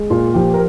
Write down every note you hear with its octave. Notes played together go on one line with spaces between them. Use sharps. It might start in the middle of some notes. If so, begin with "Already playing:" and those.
Already playing: G#3
A#2 F4
F3 G4
A#4